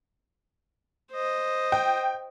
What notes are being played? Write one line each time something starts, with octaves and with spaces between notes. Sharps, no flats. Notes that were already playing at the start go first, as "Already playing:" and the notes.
C5 D#5
G5